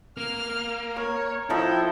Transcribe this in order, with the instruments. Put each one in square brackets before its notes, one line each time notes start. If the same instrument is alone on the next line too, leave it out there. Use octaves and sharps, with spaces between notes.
[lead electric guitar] A#3 [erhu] F6
[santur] A#4 [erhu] C#5
[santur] F3 D#4 A4 [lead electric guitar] E4 [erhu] G5